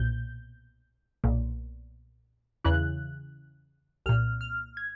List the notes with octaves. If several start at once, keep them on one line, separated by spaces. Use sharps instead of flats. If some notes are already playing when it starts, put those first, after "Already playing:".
Already playing: B1 A#2 G6
B1 A#2
E2 C#3 E3 F#6
C2 A#2 F6
F6
G#6